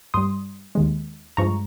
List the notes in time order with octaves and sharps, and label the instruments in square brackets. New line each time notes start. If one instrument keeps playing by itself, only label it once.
[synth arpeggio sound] G2 G3 C6 D#6
D#2 D#3 G#3
G2 F3 G#3 A#5 C#6